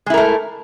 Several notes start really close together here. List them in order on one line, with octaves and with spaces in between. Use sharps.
G#3 E4 A#4 A3